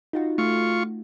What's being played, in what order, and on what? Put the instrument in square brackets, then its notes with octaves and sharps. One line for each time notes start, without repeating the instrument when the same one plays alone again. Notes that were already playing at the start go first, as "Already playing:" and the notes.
[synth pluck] D#4 F4 F#4
[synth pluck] A3 [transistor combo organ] F4 C#6